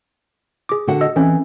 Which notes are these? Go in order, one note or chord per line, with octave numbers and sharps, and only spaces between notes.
G#4 D6
D3 F#4 F#5
D#5 E6
E3 C4 C#4 A4